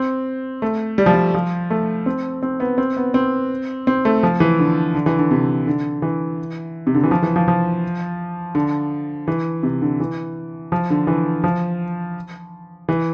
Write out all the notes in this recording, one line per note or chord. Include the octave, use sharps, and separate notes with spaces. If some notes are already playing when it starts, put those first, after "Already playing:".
Already playing: C4
A3
G3
F3
G3
F3
A3
C4
C4
B3
C4
B3
C4
C4
A3
F3
E3
D3
D3
E3
D3
C3
D3
E3
C3
D3
E3
F3
E3
F3
F3
D3
E3
C3
D3
E3
F3
D3
E3
F3
E3